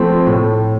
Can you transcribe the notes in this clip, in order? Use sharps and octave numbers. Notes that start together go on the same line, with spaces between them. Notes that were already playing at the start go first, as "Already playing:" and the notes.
Already playing: F3 A3 C4
A2